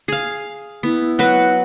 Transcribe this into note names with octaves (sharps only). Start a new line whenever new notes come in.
G#4 F5
B3 E4
F#3 F#4 B4